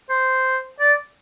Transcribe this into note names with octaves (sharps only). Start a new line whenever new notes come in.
C5
D5